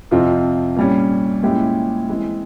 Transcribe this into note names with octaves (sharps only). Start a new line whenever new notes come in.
F2 C3 F3 C4 F4
A#2 G3 C#4
A#2 G#3 C#4 E4 G4
E3 G#3 C4